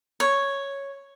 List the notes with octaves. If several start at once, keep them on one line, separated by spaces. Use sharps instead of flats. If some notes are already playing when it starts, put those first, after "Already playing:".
C#5